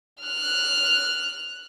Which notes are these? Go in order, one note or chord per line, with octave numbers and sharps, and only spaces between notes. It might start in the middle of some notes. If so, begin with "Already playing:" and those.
F6 F#6